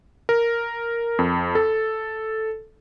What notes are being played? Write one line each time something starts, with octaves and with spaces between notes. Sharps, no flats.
A#4
F2
A4